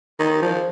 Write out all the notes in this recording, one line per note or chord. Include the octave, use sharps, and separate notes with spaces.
D#3
F3